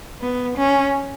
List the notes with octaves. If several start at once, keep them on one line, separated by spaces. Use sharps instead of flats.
B3
C#4